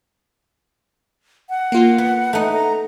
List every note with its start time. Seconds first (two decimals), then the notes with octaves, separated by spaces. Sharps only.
1.50 F#5
1.72 A#3 F4
1.98 B3
2.33 A3 D#4
2.53 A#5